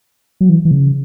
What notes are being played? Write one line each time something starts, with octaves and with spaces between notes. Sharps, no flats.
F#3
E3
E3
C#3